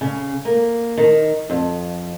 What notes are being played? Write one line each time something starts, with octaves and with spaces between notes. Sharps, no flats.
C#3
A#3
D#3
F2